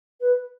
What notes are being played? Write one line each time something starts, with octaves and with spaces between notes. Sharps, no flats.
B4